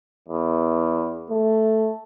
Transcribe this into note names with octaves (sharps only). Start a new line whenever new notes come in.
E2
A3